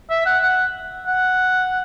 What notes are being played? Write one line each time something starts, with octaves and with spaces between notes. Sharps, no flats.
E5
F#5
F#5
F#5